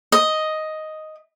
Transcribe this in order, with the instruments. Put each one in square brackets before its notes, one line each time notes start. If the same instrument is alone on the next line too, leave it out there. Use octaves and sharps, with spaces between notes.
[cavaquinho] D#5